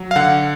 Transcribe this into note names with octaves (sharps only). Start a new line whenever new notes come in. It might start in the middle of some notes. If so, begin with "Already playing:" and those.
Already playing: F#3
F5
D3 F#5